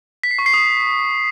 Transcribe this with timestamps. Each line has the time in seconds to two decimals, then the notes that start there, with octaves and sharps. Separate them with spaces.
0.23 B6
0.31 C7
0.39 C#6
0.46 C7
0.54 D#6